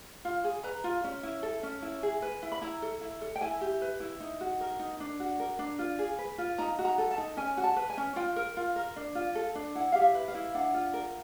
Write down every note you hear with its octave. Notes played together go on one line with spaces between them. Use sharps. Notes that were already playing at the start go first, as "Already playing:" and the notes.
F4
G#4
B4 A#5
F4
C#4
E4
A4
C#4
E4
G#4
B4
E4
B5
E4 A#5
A4
E4
A4
G5
E4 G#5
G4
B4
E4
D#4
F#4
A#4
D#4
D4
F#4
A#4
D4
F4
G#4
B4
F4
D#4 A#5
F#4
A#5
A4
A5
D#4
C#4 G#5
F#4
A5
B4
G#5
C#4
F4 G5
A#4
F4
A#4
D4
F4
A4
D4
E4 F#5
G4 F5
E5
B4
F5
E4
D4 F#5
F4
A#4